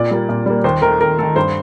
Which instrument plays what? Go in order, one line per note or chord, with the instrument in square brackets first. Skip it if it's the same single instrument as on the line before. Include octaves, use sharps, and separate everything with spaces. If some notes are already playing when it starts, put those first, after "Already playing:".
Already playing: [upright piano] A#2 D5
G3 A#3
A#2
G3 A#3
D#2 C5
D#3 A3 A#4
D#2 A#4
D#3 A3 A4
G2 C5